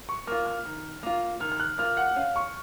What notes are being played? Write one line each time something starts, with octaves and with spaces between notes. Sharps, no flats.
C#6
A#3 F4 F6
F6
D#3
A#3 F4
D#3 F6
F6
F#6
A#3 F4 F6
F#5
C#4 F5
C#6